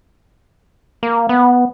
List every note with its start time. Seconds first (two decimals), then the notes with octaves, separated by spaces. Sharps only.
1.03 A#3
1.29 B3